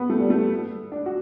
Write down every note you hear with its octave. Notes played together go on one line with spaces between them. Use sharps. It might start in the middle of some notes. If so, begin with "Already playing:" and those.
Already playing: B3
A3
G3
A3
D4
F#4